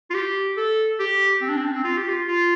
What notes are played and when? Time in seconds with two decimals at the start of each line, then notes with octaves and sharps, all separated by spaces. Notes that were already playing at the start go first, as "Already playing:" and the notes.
0.10 F4
0.14 G4
0.57 A4
0.99 G4
1.41 C4
1.49 D4
1.57 C4
1.64 D4
1.72 C4
1.84 F4
1.97 G4
2.09 F4
2.27 F4